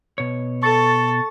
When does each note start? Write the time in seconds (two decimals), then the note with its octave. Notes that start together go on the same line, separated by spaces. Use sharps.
0.18 B2 C#5
0.63 A4 C#6 A6